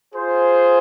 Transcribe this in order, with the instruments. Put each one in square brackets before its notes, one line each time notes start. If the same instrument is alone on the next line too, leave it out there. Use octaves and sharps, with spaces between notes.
[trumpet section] F4 G#4 C5